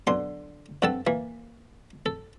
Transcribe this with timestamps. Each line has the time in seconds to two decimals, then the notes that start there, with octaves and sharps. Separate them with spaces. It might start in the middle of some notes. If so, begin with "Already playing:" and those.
0.07 B1 D3 C6
0.82 G2 C4 A4 F#5 A5
1.07 E3 A#3
2.06 A4